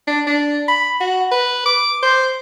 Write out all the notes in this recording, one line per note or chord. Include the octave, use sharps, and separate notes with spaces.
D4
D4
B5
F#4
B4
D6
C5